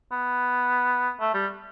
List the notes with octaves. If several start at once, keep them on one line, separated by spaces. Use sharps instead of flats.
B3
A3
G3